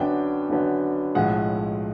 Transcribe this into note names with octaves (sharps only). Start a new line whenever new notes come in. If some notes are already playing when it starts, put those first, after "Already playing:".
Already playing: F#2 D3 F#3 B3 D4 G5
F#2 D3 F#3 B3 D4
B1 A2 F3 G#3 F#5